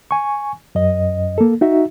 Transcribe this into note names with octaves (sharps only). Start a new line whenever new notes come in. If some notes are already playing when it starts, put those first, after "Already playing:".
G#5 C#6
F#2 D#5
A#3 A4
D#4 F#4 E5